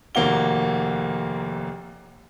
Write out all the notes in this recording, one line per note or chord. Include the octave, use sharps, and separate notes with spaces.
F1 D#2 A#3 F#4 G7